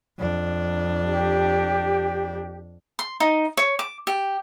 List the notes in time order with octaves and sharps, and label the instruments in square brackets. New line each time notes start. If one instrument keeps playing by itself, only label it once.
[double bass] F2 D4
[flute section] G4
[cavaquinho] C6
D#4
C#5
D6
G4